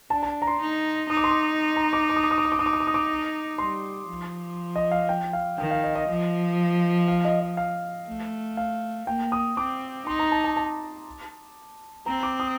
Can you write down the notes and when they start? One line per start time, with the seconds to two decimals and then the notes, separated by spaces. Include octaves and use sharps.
0.10 D4 A5
0.23 A5
0.42 A#5
0.47 C6
0.60 D#4
1.09 D#4 D#6
1.17 D6
1.24 C6
1.31 D6
1.76 A#5
1.93 D6
2.09 D6
2.16 D#6
2.23 D6
2.31 D#6
2.38 D6
2.45 D#6
2.52 D6
2.59 D#4 D#6
2.66 D6
2.73 D#6
2.80 D6
2.87 D#6
2.94 D6
3.58 G3 C6
4.09 F3
4.76 D#5
4.91 F5
5.09 G5
5.33 F5
5.58 D#3 G5
5.71 F5
5.84 D#5
5.95 D#5
6.08 F3
7.08 F5
7.25 D#5
7.41 D#5
7.57 F5
8.07 A3
8.57 F5
9.07 A#3 G5
9.32 D#6
9.57 C4 D6
10.06 D#4 C6
10.19 A#5
10.32 A5
10.44 A5
10.57 A5
12.06 C4 A#5
12.23 D6
12.40 D#6